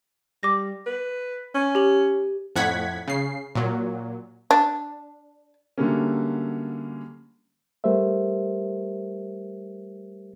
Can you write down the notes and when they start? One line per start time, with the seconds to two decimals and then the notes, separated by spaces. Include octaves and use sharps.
0.43 G3 D6 A#6
0.86 B4
1.55 C#4
1.75 G4 F#7
2.56 F2 A2 F#5 G#6 B6
3.08 C#3 C7
3.55 A#2 F#3
4.51 D4
5.78 D3 F#3 G3 A3 A#3 C#4
7.84 G3 A3 G4 A#4 C5 E5